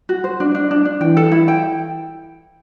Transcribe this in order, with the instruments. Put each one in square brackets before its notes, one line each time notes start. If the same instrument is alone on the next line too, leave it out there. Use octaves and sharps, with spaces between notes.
[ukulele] F#4
C5
D4
D4
D4
D4
[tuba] E3 [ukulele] G5
[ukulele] A4
E4
G5